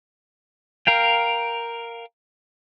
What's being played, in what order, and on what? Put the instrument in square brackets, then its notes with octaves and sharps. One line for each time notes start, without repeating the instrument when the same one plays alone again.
[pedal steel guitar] A#4 F5 G5